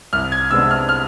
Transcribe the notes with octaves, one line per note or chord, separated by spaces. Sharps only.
C2 F6
G#6
C3 G#3 B3 D4 E6
F6
F6